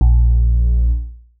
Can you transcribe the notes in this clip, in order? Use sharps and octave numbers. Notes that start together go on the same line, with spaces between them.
A#1